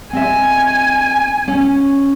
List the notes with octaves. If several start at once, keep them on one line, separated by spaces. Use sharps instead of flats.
C4 D#5 E5 G#5
C#4